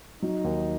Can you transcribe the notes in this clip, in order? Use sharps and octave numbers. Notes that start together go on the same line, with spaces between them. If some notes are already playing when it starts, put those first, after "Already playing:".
F#3 D#4
D#2